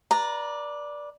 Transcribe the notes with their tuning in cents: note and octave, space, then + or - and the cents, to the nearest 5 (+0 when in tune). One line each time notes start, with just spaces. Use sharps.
B4 -30 D5 +0 A#5 +0